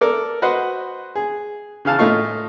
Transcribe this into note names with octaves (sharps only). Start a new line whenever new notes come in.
A4 A#4 D5
F#4 B4 C5 D#5 F#5
G#4
C#3 E3 F5 A5
A2 A3 D#4 F4 C#6